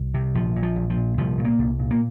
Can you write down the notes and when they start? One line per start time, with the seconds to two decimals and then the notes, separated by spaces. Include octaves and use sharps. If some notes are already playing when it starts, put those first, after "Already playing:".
Already playing: C2
0.14 C3
0.35 A#1 F3
0.56 A#2
0.63 F3
0.76 A#1
0.90 F3
0.97 A#2
1.18 C2 F3
1.38 A#2
1.45 A#3
1.59 C2
1.79 A#2
1.91 A#3